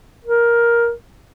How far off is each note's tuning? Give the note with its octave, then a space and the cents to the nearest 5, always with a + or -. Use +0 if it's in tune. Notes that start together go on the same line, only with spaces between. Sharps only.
A#4 +10